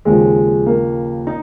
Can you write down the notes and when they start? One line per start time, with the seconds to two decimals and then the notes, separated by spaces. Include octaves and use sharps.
0.05 D#2 C#3 F3 G#3
0.67 A#3
1.27 D#4